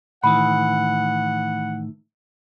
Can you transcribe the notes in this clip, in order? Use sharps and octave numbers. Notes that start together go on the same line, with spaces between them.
A2 D#3 E3 F#5 B5